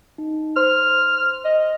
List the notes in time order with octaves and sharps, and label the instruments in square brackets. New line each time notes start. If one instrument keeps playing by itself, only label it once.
[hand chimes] D#4
[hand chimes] C5 C6 [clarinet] F6
[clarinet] D#5